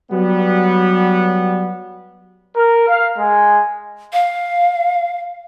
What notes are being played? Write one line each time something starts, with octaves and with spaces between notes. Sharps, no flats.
F#3 G3 B3
A#4
F5
G#3
F5